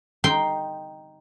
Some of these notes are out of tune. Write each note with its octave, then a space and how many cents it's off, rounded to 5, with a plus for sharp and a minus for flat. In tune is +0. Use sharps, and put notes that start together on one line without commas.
D#4 +0 G5 +0 C6 +0